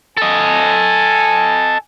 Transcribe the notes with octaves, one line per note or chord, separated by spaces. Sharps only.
A4 D#5 G#5